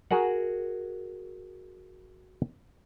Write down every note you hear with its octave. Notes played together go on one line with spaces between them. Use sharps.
F#4 G#4 A#4 F#5